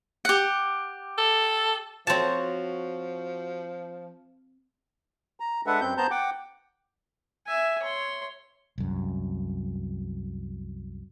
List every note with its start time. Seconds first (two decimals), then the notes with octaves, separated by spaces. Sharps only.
0.25 G4 F#5
1.18 A4
2.07 F3 C4 F#4 C#5 A5
5.40 A#5
5.66 G#3 D4 A4 B4 E5 F#5
5.81 F#2 C4 G6
5.97 B3 C5 A5 A#5 G6
6.11 F#5 G5 D6
7.46 E5 G#5
7.82 C#5 C6
8.78 C2 F#2